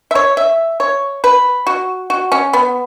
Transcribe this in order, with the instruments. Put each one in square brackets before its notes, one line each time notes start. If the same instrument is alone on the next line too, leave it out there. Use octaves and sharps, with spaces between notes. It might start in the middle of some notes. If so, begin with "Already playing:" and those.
[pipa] E5
C#5
E5
C#5
B4
F#4
F#4
C#4
B3